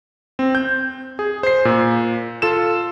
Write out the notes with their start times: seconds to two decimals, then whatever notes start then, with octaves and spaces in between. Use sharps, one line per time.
0.39 C4
0.55 G6
1.19 G#4
1.43 C5 C7
1.65 A#2
2.42 F4 A4 E7